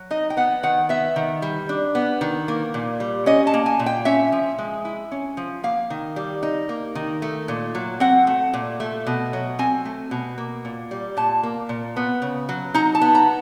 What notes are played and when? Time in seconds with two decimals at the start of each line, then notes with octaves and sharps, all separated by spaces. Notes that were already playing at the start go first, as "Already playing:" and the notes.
Already playing: F#3
0.11 D#4 D#5
0.30 G5
0.37 B3 F#5
0.63 D#3 F#5
0.89 B3 E5
1.16 D#3
1.42 G3
1.69 D4
1.95 B3
2.21 D#3
2.48 A#3
2.74 A#2
3.00 G3
3.26 C#4 D#5
3.47 A5
3.54 A#3
3.66 G#5
3.79 A#2
3.86 G5
4.05 C#4 E5
4.32 F3
4.59 G#3
4.85 E4
5.12 C#4
5.37 F3
5.64 A#3 F5
5.90 D#3
6.16 G3
6.43 D#4
6.69 A#3
6.95 D#3
7.22 A3
7.48 A#2
7.75 F#3
8.00 C4 F#5
8.27 A3
8.54 A#2
8.80 A3
9.07 B2
9.33 F#3
9.59 C4 G#5
9.85 A3
10.11 B2
10.38 A#3
10.65 A#2
10.91 G3
11.17 A#2 A5
11.43 A#3
11.69 A#2
11.96 B3
12.22 C#3
12.49 F#3
12.74 D#4 A#5
12.95 A5
13.01 B3
13.15 A#5